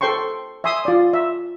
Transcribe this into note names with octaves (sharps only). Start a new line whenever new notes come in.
A4 C5 G5 C6 C#6
E5 G#5 C6 D#6
F4 D5
E5